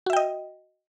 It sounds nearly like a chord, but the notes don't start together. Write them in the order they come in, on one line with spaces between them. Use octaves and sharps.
F#4 E5 G5 D#5